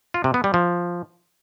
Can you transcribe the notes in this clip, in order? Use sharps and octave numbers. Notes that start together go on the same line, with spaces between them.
F4
C3
B3
G3
F3